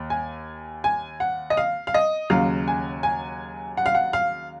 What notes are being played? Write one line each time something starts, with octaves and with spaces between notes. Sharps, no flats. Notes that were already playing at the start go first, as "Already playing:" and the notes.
Already playing: D#2
G#5
G#5
F#5
D#5
F5
F5
D#5
D#2 C#3 F#3 F5
G#5
G#5
F#5
F5
F#5
F5